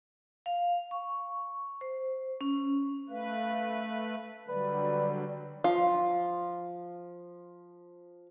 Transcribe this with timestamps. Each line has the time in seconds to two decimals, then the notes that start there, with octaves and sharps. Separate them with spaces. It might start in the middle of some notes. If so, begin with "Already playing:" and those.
0.46 F5
0.91 C#6
1.81 C5
2.41 C#4
3.09 A3 B4 F5
4.48 D3 F#3 G3 B4 D5
5.64 F3 F4